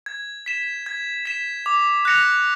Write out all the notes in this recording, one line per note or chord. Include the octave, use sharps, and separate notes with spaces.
G#6
B6 E7
G#6
B6 E7
D6
F#6 A#6 C#7 F7